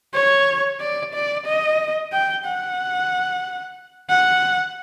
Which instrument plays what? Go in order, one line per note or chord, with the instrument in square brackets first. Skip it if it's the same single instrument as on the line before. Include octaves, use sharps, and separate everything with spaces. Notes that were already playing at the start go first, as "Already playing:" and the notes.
[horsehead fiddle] C#5
D5
D5
D#5
G5
F#5
F#5